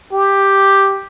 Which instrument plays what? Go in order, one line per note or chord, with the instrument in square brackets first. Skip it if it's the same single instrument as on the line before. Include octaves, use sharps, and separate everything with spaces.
[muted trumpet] G4